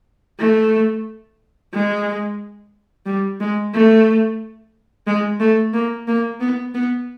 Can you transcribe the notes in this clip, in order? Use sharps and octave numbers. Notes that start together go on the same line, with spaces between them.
A3
G#3
G3
G#3
A3
G#3
A3
A#3
A#3
B3
B3